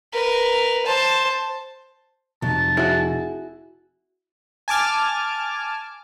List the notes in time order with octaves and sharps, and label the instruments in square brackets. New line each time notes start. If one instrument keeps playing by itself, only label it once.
[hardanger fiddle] A#4 B4
C5 A5
[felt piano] F1 [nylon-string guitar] F3 F#3 [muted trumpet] A5
[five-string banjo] E4 F#4 [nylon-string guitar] G#4
[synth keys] G#5 A5 D6 F6